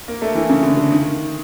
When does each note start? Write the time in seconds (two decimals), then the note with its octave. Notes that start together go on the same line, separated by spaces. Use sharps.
0.08 A#3
0.22 A3
0.35 E3
0.50 C#3
0.63 D3
0.77 D3
0.92 D#3